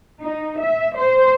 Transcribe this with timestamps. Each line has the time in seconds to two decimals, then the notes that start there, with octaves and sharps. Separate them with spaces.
0.22 D#4
0.62 E5
0.97 C5